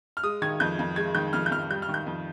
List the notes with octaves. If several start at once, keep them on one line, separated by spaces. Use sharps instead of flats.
F6
G#3 D#6
D#3 G#6
F2 G6
F2
G#3 G#6
D#3 G6
F2 F6
G6
F2 F6
G3 G6
F6
D#3
G6
F2